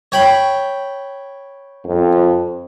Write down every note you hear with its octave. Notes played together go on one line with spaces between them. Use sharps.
C#5 G5 B5
F2